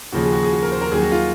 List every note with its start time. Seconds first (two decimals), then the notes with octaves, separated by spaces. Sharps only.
0.12 D#2 C#3 F3 F#4
0.22 G#4
0.33 F#4
0.43 G#4
0.52 F#4
0.63 A#4
0.72 C5
0.81 A#4
0.91 D#2 D#3 F#3 G#4
1.02 F#4
1.12 F4